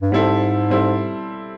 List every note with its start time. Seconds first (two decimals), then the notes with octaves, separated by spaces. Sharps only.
0.02 G2
0.12 G#2 G3 C4 E4 A4
0.70 G3 C4 E4 A4